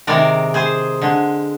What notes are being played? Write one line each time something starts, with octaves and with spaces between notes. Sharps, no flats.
C3 D#3 G#3 A#4 D5
G#4 C5
D3 G#3